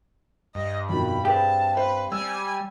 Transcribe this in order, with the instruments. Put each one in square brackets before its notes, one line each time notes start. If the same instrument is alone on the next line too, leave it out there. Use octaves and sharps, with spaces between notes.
[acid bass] G2 [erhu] D#5
[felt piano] F2 B2 D#3 [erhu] B5
[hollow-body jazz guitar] C4 G4 [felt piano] G#4 B4 [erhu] A5
[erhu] B4 [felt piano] C5
[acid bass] G3 [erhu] G#5 [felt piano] E6